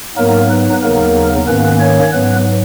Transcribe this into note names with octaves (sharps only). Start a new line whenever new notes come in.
G#2 F#3 A#3 B3 D#4 A#4
B3 B4
D#2 C#3 F#3 A#3 B3 D#4 A#4
G#2 D#3 A#3 B3 C#4 B4
C#4 C#5
G#2 F#3 B3 B4